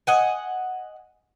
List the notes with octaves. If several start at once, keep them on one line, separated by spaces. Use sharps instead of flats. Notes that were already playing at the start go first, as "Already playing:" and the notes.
D#5 F#5 G#5